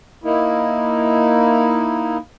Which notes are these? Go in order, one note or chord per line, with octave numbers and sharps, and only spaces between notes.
A#3 D#4 E4